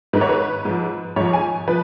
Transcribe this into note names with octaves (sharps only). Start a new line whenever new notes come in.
G#2 D#3 B4
C#5
B4
G#2 F3
G#2 F3 C#5
G#5
F3 B4